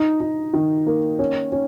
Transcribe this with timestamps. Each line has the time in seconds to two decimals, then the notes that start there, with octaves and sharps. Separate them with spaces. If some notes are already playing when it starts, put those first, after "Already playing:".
Already playing: D#4
0.20 D#4
0.54 D#3
0.87 A#3
1.19 C#4
1.52 C#4